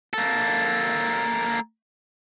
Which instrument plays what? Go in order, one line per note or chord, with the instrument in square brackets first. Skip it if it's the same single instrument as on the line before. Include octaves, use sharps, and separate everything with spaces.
[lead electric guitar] A#3 A4